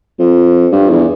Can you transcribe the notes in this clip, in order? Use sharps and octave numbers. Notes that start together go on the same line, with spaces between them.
F2
G2
E2